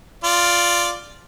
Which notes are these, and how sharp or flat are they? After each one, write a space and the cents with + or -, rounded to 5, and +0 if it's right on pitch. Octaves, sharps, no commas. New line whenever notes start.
F4 +0 D5 +0